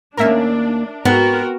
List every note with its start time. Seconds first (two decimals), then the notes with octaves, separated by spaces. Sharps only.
0.17 D#2 A#3 C#4 D4 A#4 E5
1.05 G#2 B3 C4 F#4 A#4